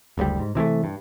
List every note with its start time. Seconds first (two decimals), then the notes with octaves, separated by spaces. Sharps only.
0.18 F#1 D2 C3 G3
0.40 G#2
0.55 C3 E3 G#3 A3
0.84 G2